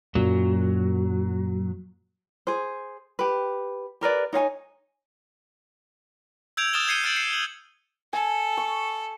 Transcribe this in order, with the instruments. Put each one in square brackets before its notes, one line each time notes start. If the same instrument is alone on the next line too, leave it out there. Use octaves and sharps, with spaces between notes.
[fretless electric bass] F#2 A#2 [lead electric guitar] F#3
[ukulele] G#4 C5
G4 B4
G4 A#4 B4 D5
D#4 C#5 F5 G#5
[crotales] E6 G6 G#6 D7 F7
D#6 F6 A6 E7 F7 G7
F6 G#6 C7 C#7 D#7 G7
F6 G6 A6 D7 F#7
C7 C#7
F#7
[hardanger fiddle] A4 [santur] G#5
[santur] C#6